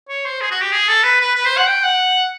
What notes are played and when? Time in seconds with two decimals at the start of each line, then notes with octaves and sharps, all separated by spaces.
0.09 C#5
0.25 C5
0.41 G#4
0.51 F#4
0.61 G4
0.72 G#4
0.88 A4
1.03 B4
1.20 B4
1.36 B4
1.46 C5
1.57 F#5
1.67 G5
1.83 F#5